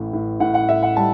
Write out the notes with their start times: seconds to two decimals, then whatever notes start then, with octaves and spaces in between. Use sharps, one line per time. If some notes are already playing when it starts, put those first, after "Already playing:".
Already playing: A1 A2
0.13 A2
0.40 A2 F#5
0.54 F#5
0.68 A2 E5
0.83 F#5
0.97 G3 A5